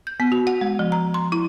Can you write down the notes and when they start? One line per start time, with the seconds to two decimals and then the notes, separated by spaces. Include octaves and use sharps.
0.07 G6
0.20 B3
0.32 F#4
0.47 F#5
0.61 G#3
0.79 F3
0.92 A#5
1.14 C6
1.32 E4